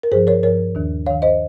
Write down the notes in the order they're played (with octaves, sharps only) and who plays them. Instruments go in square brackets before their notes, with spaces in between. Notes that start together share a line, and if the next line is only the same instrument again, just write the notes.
[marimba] A#4
G2 F3 G#4 C5
A#4 C#5
G2 F3 A#4 C#5
D#2 D#3
D#2 D#3 C#5 F5
C5 D#5